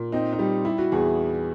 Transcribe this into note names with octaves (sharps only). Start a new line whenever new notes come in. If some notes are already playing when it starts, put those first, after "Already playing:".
Already playing: A#2
C4 D#4
D#4
G3
G3 E4
F#4
E2 G#4